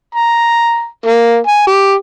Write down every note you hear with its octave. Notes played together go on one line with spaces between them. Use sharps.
A#5
A#3
G#5
G4